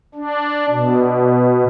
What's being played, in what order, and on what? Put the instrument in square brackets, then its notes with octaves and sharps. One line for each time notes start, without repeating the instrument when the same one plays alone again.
[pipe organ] D4
B2